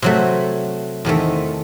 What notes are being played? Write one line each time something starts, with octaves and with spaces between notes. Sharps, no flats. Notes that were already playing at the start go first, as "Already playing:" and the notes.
C3 F#3 A3
E2 C3 D#3 A3